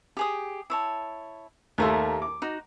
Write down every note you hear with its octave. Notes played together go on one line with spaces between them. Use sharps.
G4 G#4 D#6
E4 C#5 A5
D#2 A3 G4 A#4 E5 C6
D6
D#4 F#4